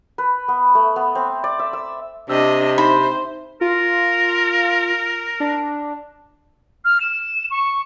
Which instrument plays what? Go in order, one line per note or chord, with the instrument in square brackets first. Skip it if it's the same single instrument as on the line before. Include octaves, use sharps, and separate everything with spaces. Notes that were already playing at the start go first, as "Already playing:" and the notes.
[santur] B4
B3
A3
B3
C4
D5
E5
E6
[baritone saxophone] C3 [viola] D4 D#5 [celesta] E6
[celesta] D#4 E5 C6 [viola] C5 [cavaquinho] B5
[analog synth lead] F4 [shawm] A#4
[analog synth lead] D4
[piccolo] F6
E7
C#6